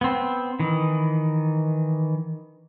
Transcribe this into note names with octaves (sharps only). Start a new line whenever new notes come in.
B3 C4
D#3 E3